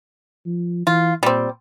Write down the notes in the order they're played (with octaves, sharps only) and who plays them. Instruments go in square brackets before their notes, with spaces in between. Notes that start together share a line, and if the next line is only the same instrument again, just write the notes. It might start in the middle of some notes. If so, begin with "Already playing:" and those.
[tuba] F3
[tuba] E3 [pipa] F4
[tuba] A#2 [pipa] G3 C4